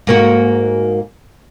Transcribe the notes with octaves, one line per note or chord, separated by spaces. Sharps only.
G#2 A#3 F#4